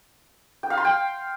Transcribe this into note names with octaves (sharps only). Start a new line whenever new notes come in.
G5
F5
C6
G5